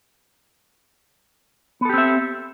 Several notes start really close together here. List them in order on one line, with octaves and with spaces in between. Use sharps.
B3 A4 G4 C4 E5